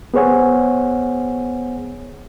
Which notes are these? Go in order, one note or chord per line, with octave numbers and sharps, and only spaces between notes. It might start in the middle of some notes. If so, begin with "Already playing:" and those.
B3 G#4 C5 C#5 F#5 G#5